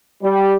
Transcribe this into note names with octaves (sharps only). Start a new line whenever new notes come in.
G3